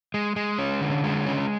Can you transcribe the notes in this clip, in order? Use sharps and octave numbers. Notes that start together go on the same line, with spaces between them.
G#3
G#3
C#4
D3
G#3
C#4